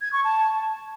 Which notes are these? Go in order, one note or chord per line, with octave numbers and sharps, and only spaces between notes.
G#6
C#6
A5